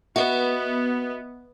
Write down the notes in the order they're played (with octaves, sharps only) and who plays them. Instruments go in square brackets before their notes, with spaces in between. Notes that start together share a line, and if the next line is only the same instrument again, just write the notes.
[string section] B3 [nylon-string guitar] F#4 [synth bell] B4 D#5 E5